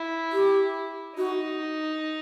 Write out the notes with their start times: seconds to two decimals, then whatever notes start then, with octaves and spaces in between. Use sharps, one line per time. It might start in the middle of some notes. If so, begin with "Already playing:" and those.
Already playing: E4
0.32 G4
1.17 D#4 F#4